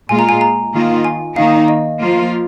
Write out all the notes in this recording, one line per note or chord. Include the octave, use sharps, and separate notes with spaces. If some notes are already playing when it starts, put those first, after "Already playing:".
A#2 G#3 F4 G#5
A#5
G#5
A#5
D#3 A#3 F4
G#5
D#3 A#3 D#4 F5
D#5
F3 A#3 F4